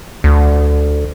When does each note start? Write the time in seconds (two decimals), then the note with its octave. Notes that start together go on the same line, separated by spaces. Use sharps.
0.24 D2